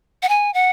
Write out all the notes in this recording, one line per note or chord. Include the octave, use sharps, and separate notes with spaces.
F#5
G#5
F#5